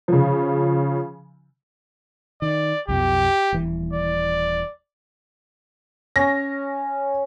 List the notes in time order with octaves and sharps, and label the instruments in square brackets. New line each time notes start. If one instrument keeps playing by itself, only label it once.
[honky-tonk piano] C#3 F3
[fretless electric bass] D#3 [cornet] D5
[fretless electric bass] B1 F2 B2 [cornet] G4
[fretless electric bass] D#1 E3
[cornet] D5
[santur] C#4 [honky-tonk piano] A#6